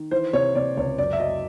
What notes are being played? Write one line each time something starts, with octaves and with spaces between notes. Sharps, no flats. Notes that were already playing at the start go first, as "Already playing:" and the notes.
Already playing: D#3
E3 C5
C3 C#5
C3 D5
C#2 C#5
F#2 D5
E5
F#3 D#5